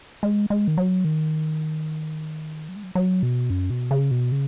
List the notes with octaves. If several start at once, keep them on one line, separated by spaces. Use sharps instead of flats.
G#3
G#3
D#3
F#3
D#3
F#3
G#3
F#3
F#3
B2
F#2
B2
C#3
B2
C#3